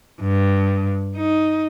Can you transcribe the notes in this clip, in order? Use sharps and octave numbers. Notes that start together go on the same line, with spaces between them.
G2
D#4